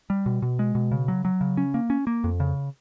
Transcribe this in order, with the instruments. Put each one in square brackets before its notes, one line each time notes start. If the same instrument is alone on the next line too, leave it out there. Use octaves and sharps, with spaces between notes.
[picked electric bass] G3
B2
B2
G#3
B2
C#3
F#3
F#3
C#3
C#4
A#3
C#4
A#3
F2
C#3